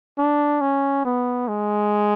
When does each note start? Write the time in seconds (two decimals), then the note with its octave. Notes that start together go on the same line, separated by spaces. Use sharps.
0.18 D4
0.61 C#4
1.05 B3
1.48 G#3